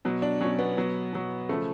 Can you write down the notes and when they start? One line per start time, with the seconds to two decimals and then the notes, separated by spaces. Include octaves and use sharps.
0.05 B2 F#3
0.22 D4
0.41 B2 F#3 C#4
0.59 B3
0.77 B2 F#3
1.13 B2 F#3
1.49 C#3 F3 A3